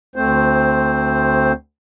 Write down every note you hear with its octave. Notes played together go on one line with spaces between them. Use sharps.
D2 A3 C4 C5